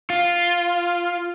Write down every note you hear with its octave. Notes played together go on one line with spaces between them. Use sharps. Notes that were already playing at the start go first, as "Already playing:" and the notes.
F4